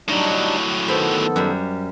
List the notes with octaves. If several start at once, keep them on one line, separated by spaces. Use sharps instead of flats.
A2 F#3 G3 D4 D#4
D#3 B3 A4 C5 B5
F#2 G3 B5